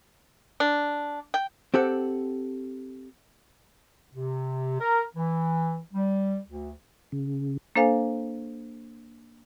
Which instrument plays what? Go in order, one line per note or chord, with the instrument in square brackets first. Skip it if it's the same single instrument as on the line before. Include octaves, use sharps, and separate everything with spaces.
[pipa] D4
G5
[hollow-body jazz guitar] C4 G4 A4 F#5
[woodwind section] C3
A#4
E3
G3
D2
[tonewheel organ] C#3
[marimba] A#3 D4 A4 C5 F5 G#5